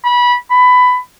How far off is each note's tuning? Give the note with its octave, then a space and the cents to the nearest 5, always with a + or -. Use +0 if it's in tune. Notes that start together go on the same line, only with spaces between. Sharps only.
B5 -20
B5 +15